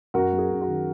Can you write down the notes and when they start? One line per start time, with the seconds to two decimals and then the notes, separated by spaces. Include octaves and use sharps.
0.14 F#2 F#4 A#4
0.33 F#3
0.38 G#4
0.51 F#2
0.61 F#4
0.68 D#3